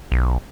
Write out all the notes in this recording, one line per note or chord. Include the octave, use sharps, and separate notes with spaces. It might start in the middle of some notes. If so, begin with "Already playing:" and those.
B1